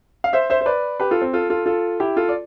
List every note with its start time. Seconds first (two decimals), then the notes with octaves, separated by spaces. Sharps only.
0.24 F5
0.33 C5 E5
0.50 C5 E5
0.61 C5
0.66 B4 D5
1.00 G4 B4
1.11 F4 A4
1.22 C4
1.33 F4 A4
1.50 F4 A4
1.66 F4 A4
2.00 E4 G4
2.17 F4 A4
2.29 D5